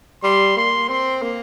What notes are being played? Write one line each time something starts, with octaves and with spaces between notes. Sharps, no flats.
G3 C6
A#3 C6
C4 C6
A#3